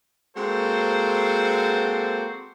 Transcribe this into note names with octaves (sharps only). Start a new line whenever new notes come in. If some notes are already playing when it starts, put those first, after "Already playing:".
G#3 A#3 C4 F#4 A4 C5